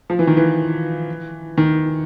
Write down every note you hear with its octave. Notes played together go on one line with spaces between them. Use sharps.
F3
E3
D#3
E3
D#3